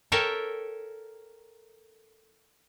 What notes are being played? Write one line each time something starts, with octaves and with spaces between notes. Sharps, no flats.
A4 A#4 C#5 E5 G5